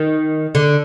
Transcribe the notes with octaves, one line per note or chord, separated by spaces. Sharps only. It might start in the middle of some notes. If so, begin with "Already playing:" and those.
Already playing: D#3
D3